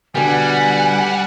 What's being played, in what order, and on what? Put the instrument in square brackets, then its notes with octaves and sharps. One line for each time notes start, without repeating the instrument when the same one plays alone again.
[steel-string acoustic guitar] B2 D3 [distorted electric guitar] G3 [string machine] F#5 [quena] G#5